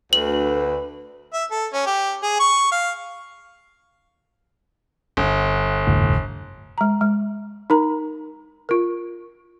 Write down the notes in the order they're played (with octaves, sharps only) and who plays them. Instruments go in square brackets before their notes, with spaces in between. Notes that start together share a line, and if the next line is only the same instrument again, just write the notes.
[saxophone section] D2 [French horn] B4 [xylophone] F#7
[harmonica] E5
A4
C#4
G4
G#4
C#6
F5
[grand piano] G1
[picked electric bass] F1 D2 A2
[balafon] G#3 A#5
G#3
D#4 A#4 A#5
F4 A#4